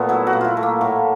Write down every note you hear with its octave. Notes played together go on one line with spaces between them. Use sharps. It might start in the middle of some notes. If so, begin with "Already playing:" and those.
Already playing: A#2 A3 B3
F#3 E4
F#4
A#2
E4 F4
A3
A#3
A2